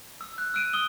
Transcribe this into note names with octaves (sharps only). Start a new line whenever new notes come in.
E6
F#6
E6 F#6 D7 D#7
D#6 E6 G7